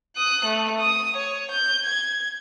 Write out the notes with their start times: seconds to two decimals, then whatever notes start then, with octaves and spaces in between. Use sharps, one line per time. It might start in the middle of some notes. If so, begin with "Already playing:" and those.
0.16 D#6 F#6
0.46 A3
0.80 D#6
1.17 C#5
1.51 G6
1.85 G#6